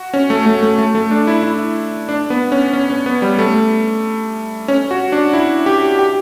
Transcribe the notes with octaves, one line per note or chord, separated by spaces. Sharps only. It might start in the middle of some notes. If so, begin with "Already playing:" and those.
Already playing: F#4
C#4
A3
A3
A3
A3
A3
D4
E4
E4
D4
B3
C#4
C#4
C#4
B3
G3
A3
C#4
F#4
D4
E4
G4
G4